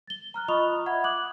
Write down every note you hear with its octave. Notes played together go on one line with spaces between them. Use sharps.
A6 G7
A#5 F6 F#6
F4 D#5 B5 C#6 D#6 F7
E5 F#5 B5 G#6
D6 D#6 F#6 F#7